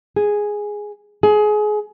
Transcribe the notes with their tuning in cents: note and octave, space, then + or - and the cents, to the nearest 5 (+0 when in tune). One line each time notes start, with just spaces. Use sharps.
G#4 +0
G#4 +25